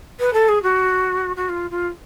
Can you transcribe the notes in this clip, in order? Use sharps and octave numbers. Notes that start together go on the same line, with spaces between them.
B4
A4
G#4
F#4
F#4
F4
F4